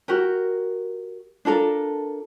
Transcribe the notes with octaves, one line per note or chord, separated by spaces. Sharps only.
F#4 G4 A#4
D4 F4 A4 A#4